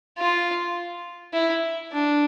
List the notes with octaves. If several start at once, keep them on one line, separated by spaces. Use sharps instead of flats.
F4
E4
D4